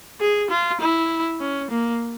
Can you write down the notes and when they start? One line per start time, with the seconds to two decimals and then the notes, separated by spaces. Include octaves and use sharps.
0.20 G#4
0.50 F4
0.81 E4
1.40 C#4
1.70 A#3